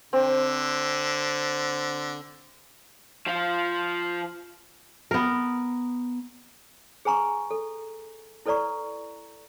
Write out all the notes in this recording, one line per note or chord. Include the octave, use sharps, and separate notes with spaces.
D3 C4
F3 F4
B3 A#4
G#4 B4 G#5 A#5 C#6
A4
E4 A4 B4 D5 A#5 C#6